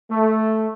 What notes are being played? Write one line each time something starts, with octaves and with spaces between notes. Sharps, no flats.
A3